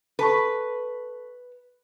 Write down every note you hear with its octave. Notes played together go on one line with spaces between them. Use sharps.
A4 B4 A5 C#6